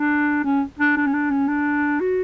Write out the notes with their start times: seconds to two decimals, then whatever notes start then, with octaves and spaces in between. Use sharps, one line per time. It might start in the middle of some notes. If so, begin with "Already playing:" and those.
Already playing: D4
0.44 C#4
0.79 D4
0.97 D4
1.06 C#4
1.14 D4
1.31 C#4
1.48 D4
2.01 F#4